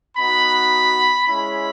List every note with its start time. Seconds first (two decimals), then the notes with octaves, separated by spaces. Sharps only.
0.17 B3 D#4 F#4 B5
1.28 G#3 C#4 E4 B5